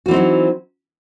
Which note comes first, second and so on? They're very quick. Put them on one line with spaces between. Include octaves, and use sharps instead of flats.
F#4 E3 C4 D#4 F#3